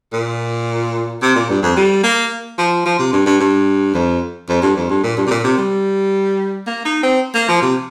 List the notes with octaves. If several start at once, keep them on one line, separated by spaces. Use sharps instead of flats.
A#2
C3
A#2
G2
F2
G3
A#3
F3
F3
C3
G2
G2
G2
F2
F2
G2
F2
G2
A#2
G2
C3
A#2
C3
G3
A#3
D#4
C4
A#3
F3
C3